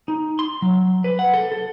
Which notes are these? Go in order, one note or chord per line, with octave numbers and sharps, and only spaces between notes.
D#4
C6
F#3
B4
F#5
A4
A4